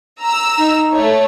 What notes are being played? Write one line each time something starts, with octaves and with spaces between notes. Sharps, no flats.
A#5 E6
D#4
A3 C#5